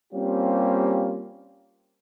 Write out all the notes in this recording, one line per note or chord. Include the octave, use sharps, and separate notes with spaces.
G3 A#3 C4 C#4 F4 G4